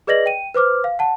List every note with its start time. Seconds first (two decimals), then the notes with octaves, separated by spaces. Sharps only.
0.07 G#4 B4 D5 D#5 A#6 F#7
0.26 G5 D#7
0.54 B4 C5 D6 F6
0.84 F5
0.99 F#5 A5